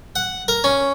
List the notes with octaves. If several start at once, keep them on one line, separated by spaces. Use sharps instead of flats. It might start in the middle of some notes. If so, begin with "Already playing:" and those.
F#5
A#4
C#4